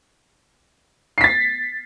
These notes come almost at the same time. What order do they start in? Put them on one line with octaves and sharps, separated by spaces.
C7 B6 A6